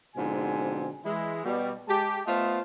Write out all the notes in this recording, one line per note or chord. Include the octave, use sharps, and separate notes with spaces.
G#2 B2 D3 F3 C4 G#5
E3 G#3 E4
B2 G3
G#3 G4 A5
A3 B3 F4 C5 D#5 F5